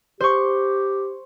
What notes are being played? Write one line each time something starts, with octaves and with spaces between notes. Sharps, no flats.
G4 C5 C#6